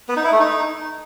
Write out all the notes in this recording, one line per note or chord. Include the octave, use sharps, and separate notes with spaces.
B3
D#4
E4
A3
D#4